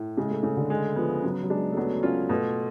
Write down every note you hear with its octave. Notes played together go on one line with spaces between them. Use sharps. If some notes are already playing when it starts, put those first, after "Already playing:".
Already playing: A2
C#3 G#3
A3
C#3 A3
D3
G#3
F3 B3
C#3 F#3
F#3
G#3 D4
A3
F#3 B3
C#4 F4
B2 A3